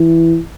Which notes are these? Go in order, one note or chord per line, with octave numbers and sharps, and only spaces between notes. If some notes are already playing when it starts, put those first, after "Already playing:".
Already playing: E3